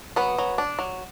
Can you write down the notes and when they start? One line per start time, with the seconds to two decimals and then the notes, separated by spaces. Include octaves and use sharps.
0.16 F#3 B3 B4
0.38 F#3
0.58 D4
0.79 F#3